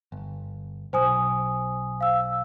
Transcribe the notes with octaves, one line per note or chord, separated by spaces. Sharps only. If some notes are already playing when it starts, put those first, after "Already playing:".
G1
B1 C5 G#5 D#6
F5 E6